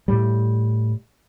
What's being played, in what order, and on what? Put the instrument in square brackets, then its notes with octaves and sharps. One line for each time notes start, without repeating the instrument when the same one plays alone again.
[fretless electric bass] A2 G3